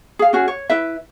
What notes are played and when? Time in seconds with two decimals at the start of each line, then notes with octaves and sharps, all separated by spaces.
0.19 G#4 F5
0.33 C#4 F#4 G#4
0.48 C#5
0.70 E4 B4 E5